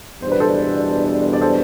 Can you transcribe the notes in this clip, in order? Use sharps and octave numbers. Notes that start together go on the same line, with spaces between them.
E2 B2 G3 D4 C5
B4
A4 C5
D5
A4 C5